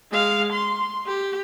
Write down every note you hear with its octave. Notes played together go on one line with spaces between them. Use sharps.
G#3 F5
C6
G4